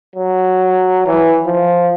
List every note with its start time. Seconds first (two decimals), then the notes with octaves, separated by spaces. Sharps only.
0.15 F#3
1.07 E3
1.47 F3